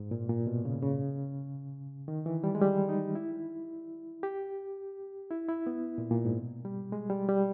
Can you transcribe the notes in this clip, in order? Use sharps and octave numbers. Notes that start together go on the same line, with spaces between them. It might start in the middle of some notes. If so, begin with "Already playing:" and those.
Already playing: G#2
A#2
A#2
B2
C#3
C#3
D#3
E3
G3
G#3
G3
D#4
E4
G4
E4
E4
B3
A#2
A#2
G#2
B2
G3
G#3
G3
G3